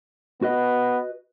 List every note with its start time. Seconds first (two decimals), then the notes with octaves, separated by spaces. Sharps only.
0.42 B3 F#4 B4 D#5